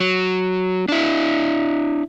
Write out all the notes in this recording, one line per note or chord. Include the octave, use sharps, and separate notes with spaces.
F#3
D4 E4